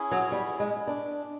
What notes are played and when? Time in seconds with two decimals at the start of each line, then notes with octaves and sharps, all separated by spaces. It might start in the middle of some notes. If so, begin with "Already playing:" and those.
Already playing: C#4 E4 G#4
0.11 F#3
0.32 G3
0.60 G#3
0.87 D4